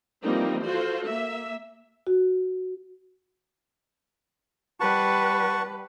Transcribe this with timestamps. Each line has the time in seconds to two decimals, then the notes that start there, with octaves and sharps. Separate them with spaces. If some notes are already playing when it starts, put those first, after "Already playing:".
0.22 E3 F3 G3 A#3 C4 D#4
0.64 F4 F#4 A4 C5
1.06 A#3 E5
2.07 F#4
4.80 G3 B4 F#5 A5 C#6